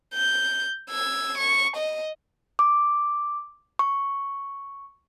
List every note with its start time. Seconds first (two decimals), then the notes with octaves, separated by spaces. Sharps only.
0.14 G6
0.90 E6 G#6
1.38 C#6
1.77 D#5
2.59 D6
3.79 C#6